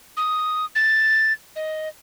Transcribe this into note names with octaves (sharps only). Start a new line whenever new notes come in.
D#6
A6
D#5